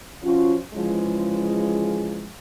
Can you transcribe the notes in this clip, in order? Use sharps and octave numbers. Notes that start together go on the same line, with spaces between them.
F3 C#4 F4 F#4 C5
C#3 E3 F3 G#3